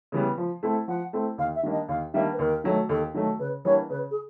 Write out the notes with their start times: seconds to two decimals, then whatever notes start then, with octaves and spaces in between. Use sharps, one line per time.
0.12 C#3 E3 G3 B3
0.38 F3
0.63 A3 C4 E4 A4
0.88 F3 F#5
1.13 A3 C4 E4 A4
1.38 D#2 F5
1.55 E5
1.63 D#3 G3 A#3 D4
1.72 D#5
1.88 D#2 F5
2.14 D#3 G3 A#3 D4 E5
2.33 B4
2.39 D#2 A#4
2.64 D#3 F#3 A3
2.89 D#2 A4
3.14 D#3 F#3 A3
3.39 C#3 B4
3.65 E3 G3 A#3 D4 C#5
3.90 C#3 B4
4.11 G#4